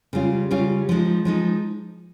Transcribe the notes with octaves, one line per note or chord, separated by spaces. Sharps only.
C#3 G3 C#4 F4
C#3 G3 C#4 F4
F3 G#3 D#4
F3 G#3 D#4